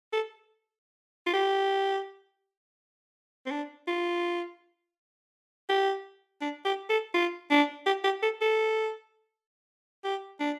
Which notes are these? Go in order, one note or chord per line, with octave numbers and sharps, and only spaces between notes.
A4
F4
G4
C4
D4
F4
G4
D4
G4
A4
F4
D4
G4
G4
A4
A4
G4
D4